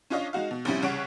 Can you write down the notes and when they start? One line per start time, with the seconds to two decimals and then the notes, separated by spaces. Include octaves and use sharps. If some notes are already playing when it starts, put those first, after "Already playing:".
0.10 C#4 D4 F4 C#5 D#5 F5
0.33 G#3 D#4 F#4 F5
0.51 B2
0.65 A#1 C3 G3 C#4 E4
0.83 C2 C#3 C#5 F#5 D7